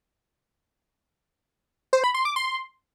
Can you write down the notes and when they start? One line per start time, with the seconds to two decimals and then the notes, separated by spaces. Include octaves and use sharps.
1.93 C5
2.04 B5
2.14 C6
2.25 D6
2.36 C6